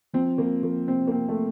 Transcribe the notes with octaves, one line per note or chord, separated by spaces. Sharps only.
F3 C4
F3 A#3
F3 A#3
C3 C4
A#3
C3 C4
A3